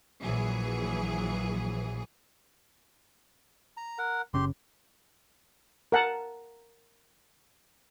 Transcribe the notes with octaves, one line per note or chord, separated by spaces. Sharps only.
A#1 E3 F#3 G#4
A#5
A#4 F#5
F#1 C#3 C#4 G4 C6
A#4 F#5 A5